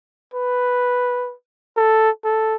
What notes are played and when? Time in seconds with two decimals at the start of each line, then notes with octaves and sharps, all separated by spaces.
0.34 B4
1.77 A4
2.25 A4